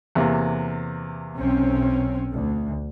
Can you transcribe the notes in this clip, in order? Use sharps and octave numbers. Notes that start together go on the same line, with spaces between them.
E2 C3 A#3
B1 C4 C#4
D2